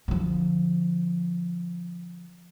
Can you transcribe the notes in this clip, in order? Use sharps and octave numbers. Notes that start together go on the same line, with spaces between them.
D3 F3